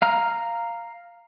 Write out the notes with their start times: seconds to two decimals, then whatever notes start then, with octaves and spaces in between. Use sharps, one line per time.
0.02 F5 A#5 F6